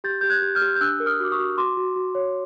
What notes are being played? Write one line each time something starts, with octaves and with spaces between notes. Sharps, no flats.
G4 G6 A6
G4 G6
F#6 G#6
G4
F6 G6
G4
G6
D4 E6 F#6
A#4
D#6 F6
F#4 D6
C#6 D#6
F#4
F#4 C6 D6
F#4
F#4
C#5